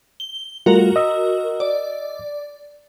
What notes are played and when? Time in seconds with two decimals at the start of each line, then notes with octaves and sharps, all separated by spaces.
0.20 G7
0.66 G3 A3 F4 F#4 A#4
0.96 D#5 E6
1.60 D5